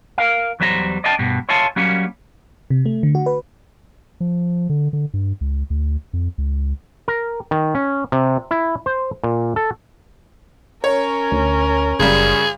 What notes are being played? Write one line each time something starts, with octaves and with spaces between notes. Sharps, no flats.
A#4 F5
E2 F#3 G3 C5 C#5 A#5
D5 D#5 F5 G5 A5
G2 B2
C#5 E5 F5 G#5 A5 C6
F#3 G3 A#3 C#4
C3
A3
D3
F#4
B4
F3
D3
D3
G2
C#2
D2
F2
C#2
A#4
D#3
C#4
C3
E4
C5
A#2
A4
C#4 A#4 C#5
D2
F#1 F#2 C#3 G3 G#4